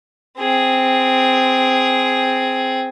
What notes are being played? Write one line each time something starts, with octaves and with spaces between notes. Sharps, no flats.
C4 G#4